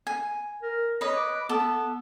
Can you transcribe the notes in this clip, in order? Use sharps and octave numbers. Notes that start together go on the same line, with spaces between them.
G#5
A#4
B4 C#5 D#5
D6
B3 A4